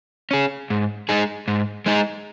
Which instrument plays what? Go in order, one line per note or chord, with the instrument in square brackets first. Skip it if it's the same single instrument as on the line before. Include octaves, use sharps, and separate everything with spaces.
[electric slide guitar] C#4 G#4
G#2
G#3 D#4 G#4
G#2
G#3 D#4 G#4